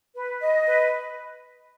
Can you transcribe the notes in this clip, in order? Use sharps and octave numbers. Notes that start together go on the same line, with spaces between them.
B4
D#5
B4